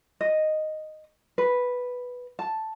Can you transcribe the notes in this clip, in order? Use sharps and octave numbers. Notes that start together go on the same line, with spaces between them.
D#5
B4
A5